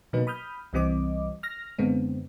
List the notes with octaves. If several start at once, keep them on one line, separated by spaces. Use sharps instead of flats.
B2 F#3 A#3 D#4 B4
B5 D#6 F6 G6
C2 E3 G3 C4 D#5 D6
F6 A#6
F#2 D3 G#3 B3 C4